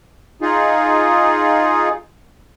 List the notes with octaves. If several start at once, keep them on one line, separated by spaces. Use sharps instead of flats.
D#4 F4 G#4